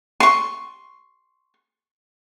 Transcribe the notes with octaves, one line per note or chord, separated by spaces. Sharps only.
C6 C#6